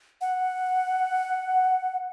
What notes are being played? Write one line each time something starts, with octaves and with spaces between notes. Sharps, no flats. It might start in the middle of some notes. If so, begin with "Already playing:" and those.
F#5